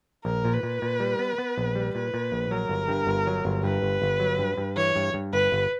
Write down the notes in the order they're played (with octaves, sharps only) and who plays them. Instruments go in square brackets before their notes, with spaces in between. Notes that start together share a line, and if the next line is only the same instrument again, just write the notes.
[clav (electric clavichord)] A#1 [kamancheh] A#4
[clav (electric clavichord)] A#2
[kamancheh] B4
[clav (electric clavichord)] A#2
A#2
G3
B3
B3
A#1
G3
[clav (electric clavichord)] A#2 [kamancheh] B4
[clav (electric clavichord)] A#2
A#1
[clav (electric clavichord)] F#3 [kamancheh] A#4
[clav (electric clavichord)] G1
G2
G1
F#3
G1
[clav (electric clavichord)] G2 [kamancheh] B4
[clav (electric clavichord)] G1
G1
F#3
G2
G2
[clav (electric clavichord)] E3 [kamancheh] C#5
[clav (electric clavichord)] G2
G2
[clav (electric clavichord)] G1 [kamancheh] B4
[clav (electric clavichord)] G1